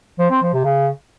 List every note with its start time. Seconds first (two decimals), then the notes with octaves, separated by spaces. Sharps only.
0.19 F3
0.31 C4
0.42 F3
0.53 C3
0.65 C#3